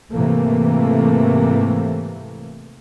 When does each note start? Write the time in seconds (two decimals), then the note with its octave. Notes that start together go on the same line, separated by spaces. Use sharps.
0.13 G#2 C3 E3 A3 A#3